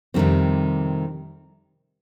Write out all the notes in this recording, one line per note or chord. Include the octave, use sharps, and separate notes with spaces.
F2 C3 D#3 G3 C4